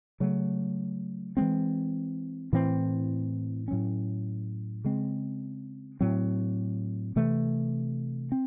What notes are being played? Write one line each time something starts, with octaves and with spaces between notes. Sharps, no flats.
C#3 F#3 A3
E3 G#3 C4
A2 E3 C4
A2 F#3 C#4
C#3 G#3 C4
A2 F#3 C4
C3 E3 A3
C4